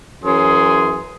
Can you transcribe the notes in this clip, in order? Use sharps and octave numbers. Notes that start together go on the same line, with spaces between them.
F#2 E3 C#4 G#4 C6